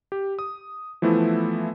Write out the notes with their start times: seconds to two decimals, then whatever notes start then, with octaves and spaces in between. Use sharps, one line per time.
0.12 G4
0.39 D#6
1.02 E3 F3 A3 B3 E4